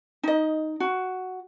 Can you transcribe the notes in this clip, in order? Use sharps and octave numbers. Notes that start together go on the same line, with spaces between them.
D#4 D#5
F#4